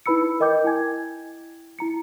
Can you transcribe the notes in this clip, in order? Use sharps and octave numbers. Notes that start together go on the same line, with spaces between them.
D#4 E4 B4 B5 E6 C#7
A#4 D#5 G5 D6 G6
E4 G5 G#5 G#6
E4 A#5 C#7